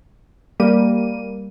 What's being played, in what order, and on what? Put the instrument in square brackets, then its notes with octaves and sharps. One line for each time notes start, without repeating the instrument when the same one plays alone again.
[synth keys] G3 A#3 D#7